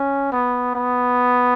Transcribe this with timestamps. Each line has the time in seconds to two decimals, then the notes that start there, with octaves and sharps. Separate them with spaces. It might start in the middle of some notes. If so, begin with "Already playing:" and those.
Already playing: C#4
0.32 B3
0.75 B3